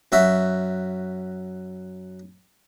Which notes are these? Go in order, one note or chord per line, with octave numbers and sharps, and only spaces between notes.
F#2 F#4 E5